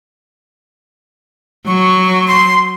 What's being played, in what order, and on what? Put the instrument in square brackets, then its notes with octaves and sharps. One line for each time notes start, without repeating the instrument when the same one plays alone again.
[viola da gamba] F#3 [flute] C#6
[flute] C6